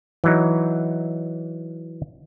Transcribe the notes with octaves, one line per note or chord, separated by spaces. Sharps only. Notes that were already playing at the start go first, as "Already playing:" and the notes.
E3 F#3 D#4